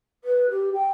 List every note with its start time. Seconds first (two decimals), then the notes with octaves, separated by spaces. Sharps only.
0.24 B4
0.50 G4
0.74 G5